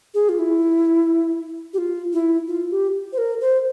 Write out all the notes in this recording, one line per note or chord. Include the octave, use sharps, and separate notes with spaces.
G#4
F4
E4
G4
F4
E4
F4
G4
C5
A#4
C5